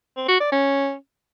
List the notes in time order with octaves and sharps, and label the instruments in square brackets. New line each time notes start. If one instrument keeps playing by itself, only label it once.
[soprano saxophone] C4
F#4
D5
C#4